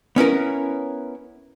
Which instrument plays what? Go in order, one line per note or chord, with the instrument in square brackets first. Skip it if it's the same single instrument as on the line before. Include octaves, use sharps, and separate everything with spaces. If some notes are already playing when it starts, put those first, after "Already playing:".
[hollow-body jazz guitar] B3 C#4 E4 A#4